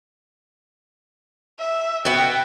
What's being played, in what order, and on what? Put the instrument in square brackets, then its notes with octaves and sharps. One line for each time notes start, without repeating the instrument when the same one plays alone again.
[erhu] E5
[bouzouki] B3 F#4 [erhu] G5